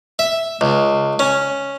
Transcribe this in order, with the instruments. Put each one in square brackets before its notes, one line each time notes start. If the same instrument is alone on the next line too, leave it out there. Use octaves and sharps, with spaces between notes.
[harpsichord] E5
C#2
C#4